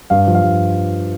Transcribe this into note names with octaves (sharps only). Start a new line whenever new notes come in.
G2 F5
F3
F5
G2